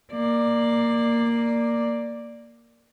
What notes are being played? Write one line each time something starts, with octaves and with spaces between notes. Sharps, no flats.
A#3 D5